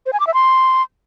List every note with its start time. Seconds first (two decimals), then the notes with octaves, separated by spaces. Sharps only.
0.06 C5
0.13 G#5
0.20 D6
0.27 E5
0.34 C6